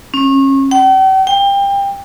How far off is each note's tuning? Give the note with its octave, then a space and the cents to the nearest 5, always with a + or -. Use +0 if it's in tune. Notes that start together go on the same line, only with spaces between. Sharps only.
C#4 -30
G5 -45
G5 +25